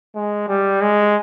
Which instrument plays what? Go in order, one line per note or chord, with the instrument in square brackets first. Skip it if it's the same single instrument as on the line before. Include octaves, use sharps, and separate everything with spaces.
[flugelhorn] G#3
G3
G#3